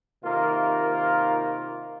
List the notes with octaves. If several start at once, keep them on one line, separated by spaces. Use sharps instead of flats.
C3 D#3 A#3 F4 A#4